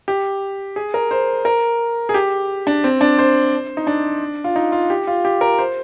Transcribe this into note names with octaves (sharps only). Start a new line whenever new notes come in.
G4
G#4
A#4
C5
A#4
G#4
G4
D4
C4
D4
C5
D#4
D4
F4
D#4
F4
G4
F4
G4
A#4
C5